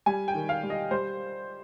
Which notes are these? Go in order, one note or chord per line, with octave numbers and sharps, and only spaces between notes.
G3 G#5
G5
D#3
F5
G3
D#5
G3 C5